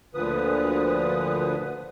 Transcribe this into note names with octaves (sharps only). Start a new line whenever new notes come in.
D2 A#2 D3 F3 B4 D#6